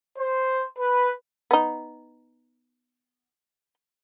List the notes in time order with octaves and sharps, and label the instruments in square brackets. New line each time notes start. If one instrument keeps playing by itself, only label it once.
[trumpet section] C5
B4
[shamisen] B3 D#4